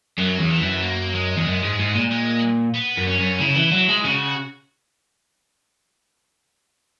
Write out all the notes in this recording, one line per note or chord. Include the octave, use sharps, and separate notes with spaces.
F#2 F#3
E2
E3
F#2
A#3
G#3
E2
F#2
G#2
G#2
A#2
G#3
B3
F#2
C#4
F#2
C#3 E4
E3
F#3
G#3
C#3 F#4